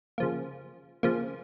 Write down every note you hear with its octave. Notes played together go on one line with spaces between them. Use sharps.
C#3 F3 A#3
C#3 F3 A#3